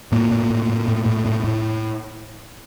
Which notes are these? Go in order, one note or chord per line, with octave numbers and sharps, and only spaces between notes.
A2 A#3
A2
A2
A2
A2
A2
A2
A2